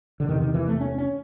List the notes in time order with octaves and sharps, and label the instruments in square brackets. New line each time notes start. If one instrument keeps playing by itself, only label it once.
[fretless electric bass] D3
E2 C3 D#3
D#3
E3
A3
C#4
C#4